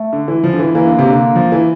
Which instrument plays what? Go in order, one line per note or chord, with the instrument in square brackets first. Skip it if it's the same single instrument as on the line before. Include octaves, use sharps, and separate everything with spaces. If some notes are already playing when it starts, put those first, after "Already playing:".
Already playing: [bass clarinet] A3
[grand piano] D3
E3
F3
D3
E3
[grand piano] E3 [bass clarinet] A#3
[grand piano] D3
C3
D3
F3
E3